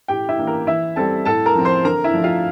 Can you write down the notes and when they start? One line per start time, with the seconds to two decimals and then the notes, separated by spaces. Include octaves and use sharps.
0.08 A2 G4 G5
0.29 E4 E5
0.38 E3 A#3 D4
0.47 A#4
0.67 E3 E4 E5
0.96 G3 C4 A4 A5
1.25 A2 A4 A5
1.46 A#4 A#5
1.55 F3 C4
1.65 C5 C6
1.85 D3 A#4 A#5
2.04 E4 E5
2.14 F3 A3 D4
2.24 F4 F5